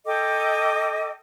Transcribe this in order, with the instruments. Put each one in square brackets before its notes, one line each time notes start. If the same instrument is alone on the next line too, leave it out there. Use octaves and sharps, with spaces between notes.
[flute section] A4 D#5 G5 D6